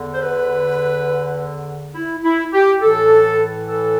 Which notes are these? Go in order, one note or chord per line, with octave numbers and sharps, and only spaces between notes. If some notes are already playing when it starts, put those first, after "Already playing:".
Already playing: E2 D3
C5
B4
E4
E4
G4
A2 E3 A4
A4